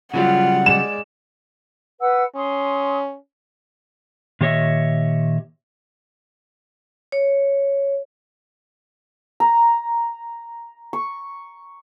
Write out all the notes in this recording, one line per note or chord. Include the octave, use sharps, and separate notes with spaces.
C#3 F#3 G3 F4 F#5
G#3 D5 E7
B4 F#5 E6
C#4 C6 D#6
A#2 D#3 G4 C#5 D#5 E5
C#5
A#5
C#6